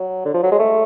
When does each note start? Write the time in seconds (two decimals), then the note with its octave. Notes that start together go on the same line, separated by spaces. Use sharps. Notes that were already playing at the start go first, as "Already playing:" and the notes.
Already playing: F#3
0.26 D3
0.34 F3
0.43 F#3
0.52 G#3
0.59 A3